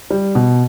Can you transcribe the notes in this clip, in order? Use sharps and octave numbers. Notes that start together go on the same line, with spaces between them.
G3
B2